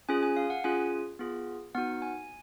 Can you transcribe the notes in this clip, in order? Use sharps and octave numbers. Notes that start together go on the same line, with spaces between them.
C#4 F4 G#4 G#5
G#5
F5
F#5
C#4 F4 G#4 G#5
B3 F4 G#4
B3 D#4 F#4 F#5
G#5